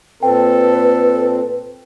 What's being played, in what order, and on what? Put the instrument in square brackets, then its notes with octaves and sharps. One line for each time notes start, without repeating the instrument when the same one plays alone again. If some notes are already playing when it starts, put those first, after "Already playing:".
[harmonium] A#2 C4 [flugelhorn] A4 [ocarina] B4 [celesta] G5